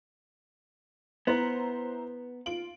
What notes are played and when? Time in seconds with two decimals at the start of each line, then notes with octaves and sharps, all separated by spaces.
1.27 B3 E4 C5 A#5
2.46 F4 D7 F#7